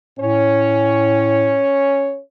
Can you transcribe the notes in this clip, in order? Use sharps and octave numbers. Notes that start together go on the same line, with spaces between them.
A2 C#4 C#5